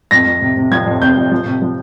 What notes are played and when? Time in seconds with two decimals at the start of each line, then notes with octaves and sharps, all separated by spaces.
0.11 F2 A#6
0.27 F2
0.41 C3
0.57 C3
0.71 F3 G#6
0.86 F2
1.01 C3 G6
1.17 F2
1.31 F3
1.46 C3
1.62 F3